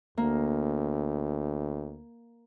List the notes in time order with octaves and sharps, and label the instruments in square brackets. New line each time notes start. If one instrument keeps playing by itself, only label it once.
[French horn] D2 [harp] A#3